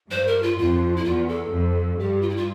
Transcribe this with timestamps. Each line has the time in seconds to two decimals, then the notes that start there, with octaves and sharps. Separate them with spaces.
0.11 G2 C5
0.27 A#4
0.43 F4
0.58 F2 F4
0.96 E4
1.04 E2 F4
1.28 A4
1.52 F2
1.99 G2 G4
2.22 F4
2.29 E4
2.36 F4